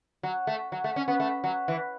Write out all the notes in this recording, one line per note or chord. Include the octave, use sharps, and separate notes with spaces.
F#3
A3
F#3
A3
C#4
B3
A3
F#3
E3